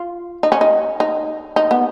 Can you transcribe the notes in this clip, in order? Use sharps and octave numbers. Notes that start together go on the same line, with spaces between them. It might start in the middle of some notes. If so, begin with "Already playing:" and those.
Already playing: F4
D#4
C#4
D#4
D#4
D#4
B3